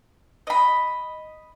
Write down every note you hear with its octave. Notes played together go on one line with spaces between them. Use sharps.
D#5 B5